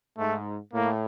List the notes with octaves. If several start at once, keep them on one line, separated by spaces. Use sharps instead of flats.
G#2 A3
A2 A#3